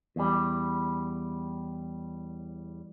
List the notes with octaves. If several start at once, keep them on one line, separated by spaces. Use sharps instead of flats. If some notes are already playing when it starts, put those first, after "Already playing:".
E2 G3